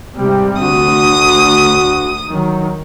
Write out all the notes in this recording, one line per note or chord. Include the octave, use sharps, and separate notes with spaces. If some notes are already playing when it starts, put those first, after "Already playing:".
G#2 C3 G3 G4
D2 F#4 D#6
D#3 F#3